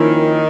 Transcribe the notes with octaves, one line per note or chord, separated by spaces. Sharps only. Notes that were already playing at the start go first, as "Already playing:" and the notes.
Already playing: D#3 F3 A#3 C#4 E4